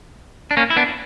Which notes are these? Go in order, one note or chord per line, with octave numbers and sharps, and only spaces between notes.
D4
A#3 C#4
E4
B3 D4